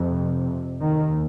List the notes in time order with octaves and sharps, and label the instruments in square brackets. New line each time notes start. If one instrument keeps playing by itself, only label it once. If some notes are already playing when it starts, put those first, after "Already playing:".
Already playing: [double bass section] F2 C3
D#2 D#3